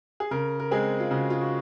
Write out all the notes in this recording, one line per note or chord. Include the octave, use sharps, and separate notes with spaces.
G#4
C#3 A#4
A#4
G#3 C4 G#4
F4
C#3 F#4
F4
F#4